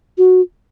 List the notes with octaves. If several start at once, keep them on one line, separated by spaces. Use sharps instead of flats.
F#4